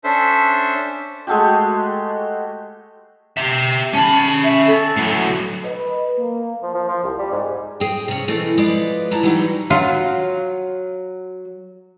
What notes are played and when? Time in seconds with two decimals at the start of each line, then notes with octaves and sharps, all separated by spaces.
0.04 C#4 D4 A4 C5 E5
1.27 G#3 A3 F#4 G4
3.37 G4 E5
3.94 C#4 A5 B5
4.44 E5
4.67 A4
4.97 A2 F#3
5.64 B4 D#5
6.18 A#3
6.63 F3
6.74 F3
6.88 F3
7.03 C2
7.19 G3
7.32 G#2
7.80 G#4 G5
8.08 C3 C#4
8.28 B2 E3 A3 C4
8.57 F3 G#3 B4 D5
9.11 E4 A5 A#5
9.23 E3 F#3 G3 D#4
9.70 F#3 F4